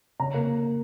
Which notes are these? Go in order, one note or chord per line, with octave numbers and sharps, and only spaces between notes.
C#3 A#5
A#3